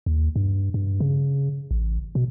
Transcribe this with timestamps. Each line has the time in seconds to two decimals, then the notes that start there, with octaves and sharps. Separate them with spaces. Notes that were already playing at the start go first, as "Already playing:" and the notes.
0.06 D#2
0.36 G2
0.74 G2
1.00 C#3
1.71 A1
2.15 B2